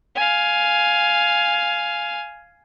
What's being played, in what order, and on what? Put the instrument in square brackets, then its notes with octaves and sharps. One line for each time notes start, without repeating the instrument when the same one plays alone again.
[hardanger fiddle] F5 G#5